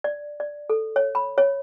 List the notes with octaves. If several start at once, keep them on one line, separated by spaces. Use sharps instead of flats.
D5
D5
A4
C#5
B5
C#5